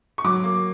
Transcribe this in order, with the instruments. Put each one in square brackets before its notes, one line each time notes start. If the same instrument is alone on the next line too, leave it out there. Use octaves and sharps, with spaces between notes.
[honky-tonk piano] C#6
F#3 D6
A#3